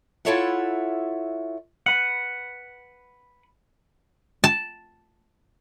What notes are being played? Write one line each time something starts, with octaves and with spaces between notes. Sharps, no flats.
E4 F4 A4 C#5 E5 F#5
B4 F#5
A5